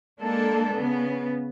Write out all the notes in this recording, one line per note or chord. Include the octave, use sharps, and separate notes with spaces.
G#3 A#3 D4 A4
C#3 B3